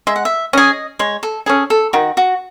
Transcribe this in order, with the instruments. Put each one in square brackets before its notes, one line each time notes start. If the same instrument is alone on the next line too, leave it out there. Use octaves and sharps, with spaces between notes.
[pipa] G#3 [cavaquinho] E5
[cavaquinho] F#5
E5
[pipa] C#4 G#4 [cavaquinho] D#5
[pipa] G#3 [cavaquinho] C#5
[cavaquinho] A4
[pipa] C#4 G#4 [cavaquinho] A4
[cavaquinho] A4
[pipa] D#3 [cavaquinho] F#4
[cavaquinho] F#4